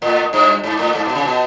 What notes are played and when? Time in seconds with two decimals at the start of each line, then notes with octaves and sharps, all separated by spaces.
0.02 A2
0.33 G2
0.63 G#2
0.79 A2
0.95 G#2
1.05 B2
1.15 C#3
1.25 B2